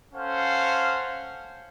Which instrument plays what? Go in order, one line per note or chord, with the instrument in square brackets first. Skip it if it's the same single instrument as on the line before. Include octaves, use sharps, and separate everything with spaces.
[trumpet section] C#4 A4 C5 F5 F#5